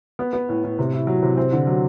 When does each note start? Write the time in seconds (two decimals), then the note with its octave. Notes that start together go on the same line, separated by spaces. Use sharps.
0.19 B3
0.33 B3
0.49 A2
0.64 A2
0.79 C3
0.93 E4
1.07 F#3
1.23 C3
1.37 C4
1.52 D3
1.67 F#3